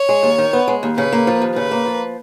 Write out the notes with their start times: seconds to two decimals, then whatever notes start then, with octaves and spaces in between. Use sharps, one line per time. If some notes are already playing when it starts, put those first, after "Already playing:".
Already playing: C#5
0.09 G#3
0.23 D#2
0.38 D#3
0.53 B3
0.68 G#3
0.83 D#2
0.97 C#3 B4
1.12 A#3
1.27 F3
1.42 D#2
1.56 C#3 B4
1.71 A#3
1.86 F3